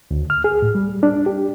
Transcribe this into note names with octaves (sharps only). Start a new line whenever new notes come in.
D2
F6
G#4
A2
G3
D4
G4